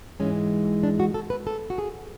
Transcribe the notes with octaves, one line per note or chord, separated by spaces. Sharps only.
G#2 E3 G#3 C#4
D4
F#4
A4
B4
A4
F#4
G#4